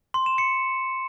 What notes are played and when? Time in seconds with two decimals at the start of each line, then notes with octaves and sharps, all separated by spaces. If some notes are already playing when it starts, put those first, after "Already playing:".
0.14 C6
0.26 E7
0.38 C#7